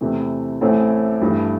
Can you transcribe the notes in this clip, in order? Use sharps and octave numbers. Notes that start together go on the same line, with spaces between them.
E2 C3 E3 A3
A1 A2 E3 A3 C4
G2 E3 A3